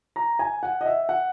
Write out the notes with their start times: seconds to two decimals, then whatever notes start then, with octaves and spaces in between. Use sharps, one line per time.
0.16 A#5
0.39 G#5
0.63 F#5
0.81 D#5
0.86 E5
1.09 F#5